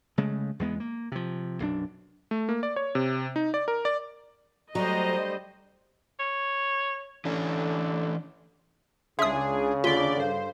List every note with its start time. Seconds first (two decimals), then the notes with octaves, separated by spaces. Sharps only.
0.18 C#3 G#3 A3
0.59 E2 G2 G#3 B3
0.80 A#3
1.12 C3 F3
1.60 B1 F#2 D4
2.31 A3
2.49 A#3
2.63 D5
2.76 C#5
2.95 C3
3.36 D#4
3.54 D5
3.68 A#4
3.85 D5
4.75 D3 F#3 G3 A3 C5 D#5 A#5
6.19 C#5
7.25 D3 E3 C#4
9.19 C#2 C#3 D4 G#4 E5 C6 D#6
9.84 D#2 D3 F4 D5 B6 G7
10.17 G2 A4 C5 F5